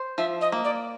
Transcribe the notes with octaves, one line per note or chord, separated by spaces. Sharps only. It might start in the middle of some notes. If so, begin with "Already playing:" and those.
Already playing: C5
F3 E5
D#5
A#3
D5